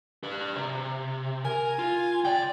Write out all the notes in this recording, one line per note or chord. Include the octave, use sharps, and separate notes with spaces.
G4 B4
C3
A#4 G#5
F4
C2 D5 G5